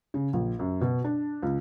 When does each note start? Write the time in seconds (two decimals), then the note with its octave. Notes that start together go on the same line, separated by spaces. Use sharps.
0.14 C#3
0.33 A#1
0.59 F#2
0.81 B2
1.04 D4
1.42 C#2